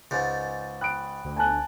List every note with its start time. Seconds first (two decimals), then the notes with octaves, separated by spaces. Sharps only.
0.11 C#2 G#2 G6 A6
0.81 G5 B5 D#6 F#6 D7
1.25 D2
1.37 G#5 A5 F#6